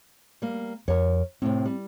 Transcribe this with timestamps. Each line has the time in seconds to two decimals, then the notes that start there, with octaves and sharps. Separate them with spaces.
0.42 G3 A#3
0.88 F2 A#4 C#5
1.42 A2 C3 C4
1.65 G3